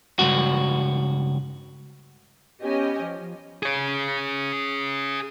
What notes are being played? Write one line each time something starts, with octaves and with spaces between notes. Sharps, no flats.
C#2 G2 F#4
B3 C#4 G4 D#5 G#5
F3
G#4 C#5